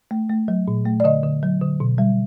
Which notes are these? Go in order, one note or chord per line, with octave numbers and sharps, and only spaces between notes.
A3
A3
F#3
A#2
A3
D5
D3 D#5
D3
F#3
D3
B2
G3